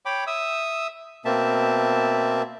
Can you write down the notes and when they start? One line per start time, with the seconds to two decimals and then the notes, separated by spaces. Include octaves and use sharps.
0.06 C#5 G5 B5 D6
0.27 E5 D#6 E6
1.25 B2 A#3 C4 E5 A5